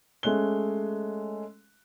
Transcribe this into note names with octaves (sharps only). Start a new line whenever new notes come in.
G#3 A3 C#4 F#6 G7